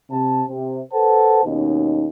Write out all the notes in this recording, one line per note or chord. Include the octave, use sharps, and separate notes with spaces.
C3 A5
C3
A4 B4 C5 F#5 A5
D#2 B2 C#4 D#4